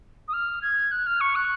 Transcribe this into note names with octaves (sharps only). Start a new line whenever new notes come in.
D#6
F6
G#6
F#6
F6
C#6
F#6